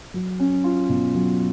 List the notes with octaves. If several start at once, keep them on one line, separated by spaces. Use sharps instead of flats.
F#3
C#4
F4
B2
F#3